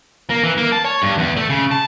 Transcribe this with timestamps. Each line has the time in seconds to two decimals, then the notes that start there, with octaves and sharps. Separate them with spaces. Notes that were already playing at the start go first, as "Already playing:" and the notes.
0.30 A#3
0.43 E3
0.58 A#3
0.72 A5
0.84 C#5
1.02 G2
1.18 E2
1.37 A3
1.50 C#3
1.71 A5